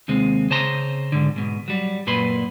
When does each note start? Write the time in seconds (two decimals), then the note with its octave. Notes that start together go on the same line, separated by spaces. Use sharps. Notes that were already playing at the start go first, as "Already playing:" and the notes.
0.08 D#2 C3 G#3 C4
0.50 C#3 C5 A5 A#5 C6
1.12 G#2 D3
1.36 G#2 B2
1.68 F#3 G3
2.07 F#2 A#2 B4 B5 C6